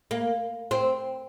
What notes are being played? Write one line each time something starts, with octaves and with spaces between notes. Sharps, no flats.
A#3
C4